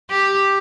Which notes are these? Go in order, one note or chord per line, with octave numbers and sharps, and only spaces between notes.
G4